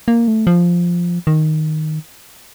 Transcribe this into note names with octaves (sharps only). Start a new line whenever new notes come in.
A#3
A3
F3
D#3